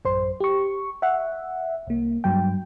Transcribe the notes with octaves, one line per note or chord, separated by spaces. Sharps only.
A1 F#2 C5 C6
G4 C#6
E5 F#5
C2 A#3
G2 F#3 G5